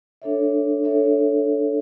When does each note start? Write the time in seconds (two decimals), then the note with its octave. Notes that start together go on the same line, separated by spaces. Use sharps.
0.22 D4 A4 C#5 E5
0.84 D4 A4 C#5 E5